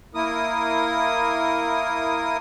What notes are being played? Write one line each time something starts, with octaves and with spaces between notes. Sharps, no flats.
A#3 E4 A#4 D#6